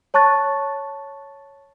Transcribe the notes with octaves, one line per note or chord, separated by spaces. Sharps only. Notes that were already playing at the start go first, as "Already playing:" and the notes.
C#5 A5 C#6 F#6 A6